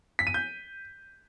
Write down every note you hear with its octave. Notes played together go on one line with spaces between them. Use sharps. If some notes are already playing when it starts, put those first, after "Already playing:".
B6
D#7
G6